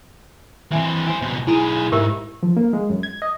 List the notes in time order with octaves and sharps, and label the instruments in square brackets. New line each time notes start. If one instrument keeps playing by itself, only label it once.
[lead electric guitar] E3 C4 [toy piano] E5 G#5 B5
[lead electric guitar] E4 C5 [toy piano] G#5
[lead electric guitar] C#2 B2
[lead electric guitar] B1 G#4 [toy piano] E4 G#5 B5
[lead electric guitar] G#2 [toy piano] G4 A#4 E5
[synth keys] F3
A#3
G#3
F#2
G#6
D#5